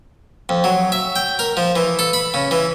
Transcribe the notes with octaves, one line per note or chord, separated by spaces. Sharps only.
F2
F#3
E5
G5
A#4
F3
E3
A4
B5
C#3
E3